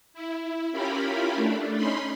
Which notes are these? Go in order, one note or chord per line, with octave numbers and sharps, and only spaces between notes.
E4
C#4 E4 F4 G4 A#4 B5
A3 D4
C#4 D#4 B5 C6